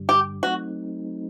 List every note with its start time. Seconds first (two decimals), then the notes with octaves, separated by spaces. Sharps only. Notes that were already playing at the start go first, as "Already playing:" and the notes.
Already playing: G2 D3 G3
0.09 G4
0.43 F#3 A3 C4 D#4 F#4